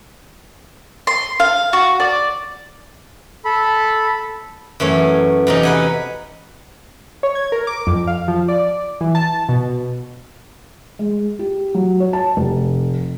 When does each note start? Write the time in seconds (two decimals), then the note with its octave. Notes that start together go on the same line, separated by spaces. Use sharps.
1.07 C6
1.40 F5
1.73 F#4
2.00 D5
3.45 A4 B5
4.80 F#2 E3 A3 C#5
5.47 E2 C3 D#4
5.63 B4 F#5 G#5
7.23 C#5
7.35 G#6
7.52 A#4
7.67 D6
7.87 F2
8.07 F5
8.28 F3
8.48 D5
9.01 E3
9.15 A5
9.49 B2
10.99 G#3
11.39 G4
11.74 F#3
12.00 C#5
12.13 A5
12.37 F1